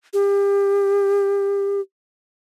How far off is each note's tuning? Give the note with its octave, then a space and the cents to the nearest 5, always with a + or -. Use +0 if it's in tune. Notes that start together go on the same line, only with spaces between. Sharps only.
G4 +30